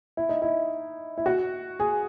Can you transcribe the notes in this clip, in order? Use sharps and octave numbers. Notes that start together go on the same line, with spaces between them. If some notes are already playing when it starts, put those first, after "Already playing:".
E4
D#4
E4
E4
F#4
G#4